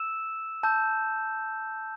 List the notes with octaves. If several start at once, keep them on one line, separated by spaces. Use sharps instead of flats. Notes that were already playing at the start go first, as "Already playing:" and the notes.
Already playing: E6 E7
A5 E6 G6